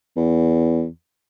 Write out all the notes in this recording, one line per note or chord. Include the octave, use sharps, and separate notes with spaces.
E2